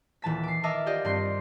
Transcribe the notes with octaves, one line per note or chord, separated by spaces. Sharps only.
D#1 E3 A5 B6
D6 C7
A#4 D#5 E5 A5 D6 F6
F4 G4 D5 D#5
G2 C4 C6 C7